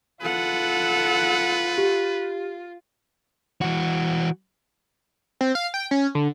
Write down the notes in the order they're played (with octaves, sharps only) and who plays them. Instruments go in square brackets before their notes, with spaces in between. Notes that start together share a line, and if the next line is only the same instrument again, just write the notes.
[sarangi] F4 [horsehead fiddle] A4 F#5 [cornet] B4
[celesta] G4
[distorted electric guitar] E3 F#4
[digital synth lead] C4
F5
G5
C#4
D3